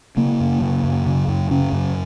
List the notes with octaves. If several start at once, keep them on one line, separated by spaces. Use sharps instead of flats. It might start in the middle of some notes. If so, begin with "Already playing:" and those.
C#3 A#3
F#2
C#3
F#2
C#3
F#2
C#3 C#4
F#2